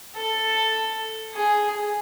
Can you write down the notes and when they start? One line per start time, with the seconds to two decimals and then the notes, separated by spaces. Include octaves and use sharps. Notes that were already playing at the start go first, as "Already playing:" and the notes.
0.16 A4
1.34 G#4